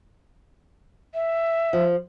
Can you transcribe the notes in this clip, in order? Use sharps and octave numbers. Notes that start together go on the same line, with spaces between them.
E5
F3